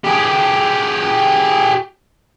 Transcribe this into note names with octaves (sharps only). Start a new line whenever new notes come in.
G4 G#4